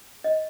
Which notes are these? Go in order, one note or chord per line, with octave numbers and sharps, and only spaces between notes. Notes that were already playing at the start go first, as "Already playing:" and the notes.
D#5